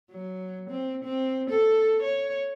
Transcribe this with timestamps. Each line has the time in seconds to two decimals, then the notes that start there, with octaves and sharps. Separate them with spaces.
0.11 F#3
0.70 C4
1.04 C4
1.50 A4
2.03 C#5